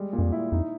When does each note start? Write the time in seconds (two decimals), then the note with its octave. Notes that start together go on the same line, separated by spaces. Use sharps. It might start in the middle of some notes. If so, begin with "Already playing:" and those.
Already playing: G3 G#3
0.13 A#2
0.19 F#2
0.23 F2
0.32 E4
0.52 F2 D#4